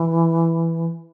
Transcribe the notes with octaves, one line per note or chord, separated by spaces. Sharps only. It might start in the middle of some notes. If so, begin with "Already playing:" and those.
Already playing: E3